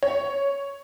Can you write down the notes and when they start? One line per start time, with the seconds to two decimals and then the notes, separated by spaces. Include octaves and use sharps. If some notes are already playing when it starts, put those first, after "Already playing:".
0.03 C#5